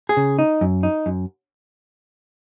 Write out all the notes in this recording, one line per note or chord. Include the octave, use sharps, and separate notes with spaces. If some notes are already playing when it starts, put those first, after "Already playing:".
G#4
C#3
D#4
F#2
D#4
F#2